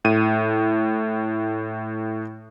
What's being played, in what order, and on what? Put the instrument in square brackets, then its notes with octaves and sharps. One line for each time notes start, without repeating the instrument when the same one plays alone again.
[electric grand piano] A2 D#7